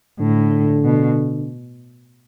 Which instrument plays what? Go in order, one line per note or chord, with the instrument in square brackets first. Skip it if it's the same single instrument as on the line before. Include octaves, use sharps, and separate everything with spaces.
[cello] A2 [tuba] D3
[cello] B2